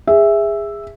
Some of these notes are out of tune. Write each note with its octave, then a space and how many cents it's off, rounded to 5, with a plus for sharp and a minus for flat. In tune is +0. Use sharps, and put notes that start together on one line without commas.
G#4 -20 E5 +0